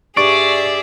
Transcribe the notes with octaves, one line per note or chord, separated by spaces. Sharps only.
G2 G#4 D5 E5 C#6